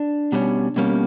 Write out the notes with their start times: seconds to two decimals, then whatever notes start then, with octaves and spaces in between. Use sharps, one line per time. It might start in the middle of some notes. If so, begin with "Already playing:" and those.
Already playing: D4
0.32 B2 G3 A#3 C#4
0.76 B2 G3 A#3 C#4